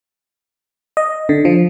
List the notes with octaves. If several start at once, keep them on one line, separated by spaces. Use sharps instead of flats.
D#5
D3
F3